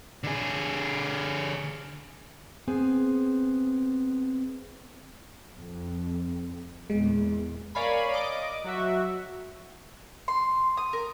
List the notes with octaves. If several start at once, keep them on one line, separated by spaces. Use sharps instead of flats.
D3 G#4
B3 C4 G#4 G#5
F2
E2 A#2 G#3
A#4 C#5 D5 F5 G#5 B5
D#5 D6
F#3 F#4 E5
C6
D#6
A#4